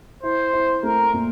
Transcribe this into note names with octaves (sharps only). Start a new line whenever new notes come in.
E4 C5
E4
A3 A#4
A#2